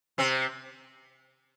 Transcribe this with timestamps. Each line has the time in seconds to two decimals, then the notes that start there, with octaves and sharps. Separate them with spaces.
0.18 C3 C4